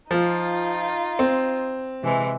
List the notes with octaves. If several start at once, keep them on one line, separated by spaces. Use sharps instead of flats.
F3 D#4 F4
C4
C3 E3 G#3